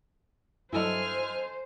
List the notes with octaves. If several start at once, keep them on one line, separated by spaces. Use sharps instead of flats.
G2 F#3 E4 A4 C5 D#5 G#5 F6